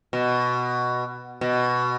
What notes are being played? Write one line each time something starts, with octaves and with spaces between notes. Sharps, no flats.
B2
B2